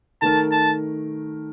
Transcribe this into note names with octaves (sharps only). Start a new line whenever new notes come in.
D#3 A3 D#4 A#4 A5
A5